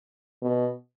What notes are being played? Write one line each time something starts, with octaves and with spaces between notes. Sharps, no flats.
B2